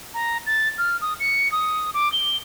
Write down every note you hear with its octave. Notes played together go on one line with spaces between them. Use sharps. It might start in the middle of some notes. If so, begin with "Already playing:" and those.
A#5
A6
F6
D#6
C#7
D#6
D6
G7